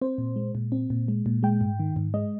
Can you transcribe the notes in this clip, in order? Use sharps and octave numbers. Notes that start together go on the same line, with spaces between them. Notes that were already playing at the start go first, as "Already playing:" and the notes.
C4 C5
A#2
G#3
A#2
C4
A#2
G#3
A#2
G#3 G5
G#2
D#3
G#2
G#3 D#5